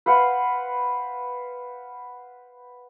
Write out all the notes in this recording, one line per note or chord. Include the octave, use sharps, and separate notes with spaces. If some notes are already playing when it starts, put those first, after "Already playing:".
B4 C5 F5 F#5